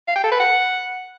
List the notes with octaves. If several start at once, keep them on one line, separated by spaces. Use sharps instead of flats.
F5
G5
A4
B4
F#5